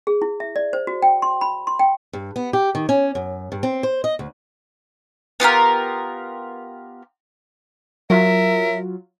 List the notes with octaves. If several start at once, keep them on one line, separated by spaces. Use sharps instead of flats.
G#4
E4
E5
D5
C5
F#4
G5
C6
B5
C6
G5
G2
B3
G4
D#3
C#4
F#2
G2
C4
C5
D#5
D2
B3 F4 G4 A#4
F#3 F4 A#4 E5